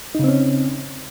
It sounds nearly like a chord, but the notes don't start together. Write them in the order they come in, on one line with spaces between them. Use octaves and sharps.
D#4 C#3 C4 C#4